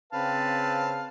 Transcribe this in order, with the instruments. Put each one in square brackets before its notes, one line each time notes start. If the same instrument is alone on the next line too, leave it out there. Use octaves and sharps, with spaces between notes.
[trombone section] C#3 C4 [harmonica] B4 F5 A5